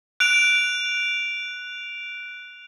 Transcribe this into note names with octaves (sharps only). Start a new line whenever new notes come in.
F#6 D7 F7